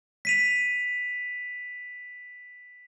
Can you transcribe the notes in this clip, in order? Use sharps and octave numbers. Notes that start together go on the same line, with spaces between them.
B6 D#7 F7